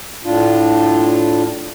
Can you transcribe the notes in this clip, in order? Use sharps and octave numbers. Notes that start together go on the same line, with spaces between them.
A2 D4 F4